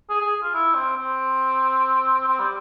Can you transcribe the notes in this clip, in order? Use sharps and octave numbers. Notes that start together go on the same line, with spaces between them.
G#4
G#4
F4
E4
C4
C4
C4
G3